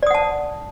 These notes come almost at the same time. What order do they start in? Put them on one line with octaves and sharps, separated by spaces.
D5 D#6 F#5 A5